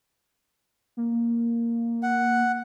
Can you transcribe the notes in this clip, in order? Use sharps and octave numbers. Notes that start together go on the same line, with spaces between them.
A#3
F#5